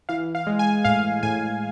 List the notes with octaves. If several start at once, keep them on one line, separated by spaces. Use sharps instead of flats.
E3 F5
F5
G#3
G#5
A2 F5
A2 G#5